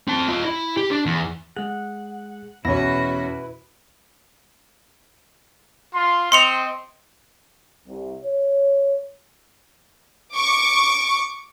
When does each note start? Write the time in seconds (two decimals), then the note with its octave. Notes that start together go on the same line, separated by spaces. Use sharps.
0.08 C4 A5
0.28 F4 D#5
0.45 E4
0.77 G4
0.91 D4
1.06 E2
1.57 G#3 G#4 F#5
2.65 E2 B2 C#4 E4 F#4 B4 A#6
5.94 F4 C6
6.32 C4 D#5 C6 C#7 F7
7.87 C2
8.24 C#5
10.36 C#6 D6